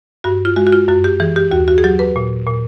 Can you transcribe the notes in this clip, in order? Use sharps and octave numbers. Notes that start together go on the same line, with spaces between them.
G2 F#4
F4
G#3 F#4
F#4
F4
F#2 F#4
G4
E3 G#4
G4
D#2 F#4
F#4
G#4
F#3 G4
B4
A#2
A#2